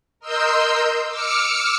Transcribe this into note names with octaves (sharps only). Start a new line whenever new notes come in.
A#4 D#5 C6 E6 G6
D6 E6 F6 C#7